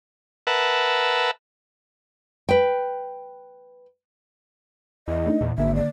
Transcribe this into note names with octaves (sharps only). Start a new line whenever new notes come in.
A#4 B4 E5 F#5 A5
B4 G5
E2 D#5
A3 D4 D#4
E2 A#2
G#1 D3 A#3 E5
D5